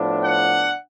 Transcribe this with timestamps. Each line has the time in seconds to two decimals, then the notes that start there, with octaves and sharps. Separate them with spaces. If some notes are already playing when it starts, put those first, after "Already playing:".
Already playing: A2 F3 B3 D4
0.23 F#5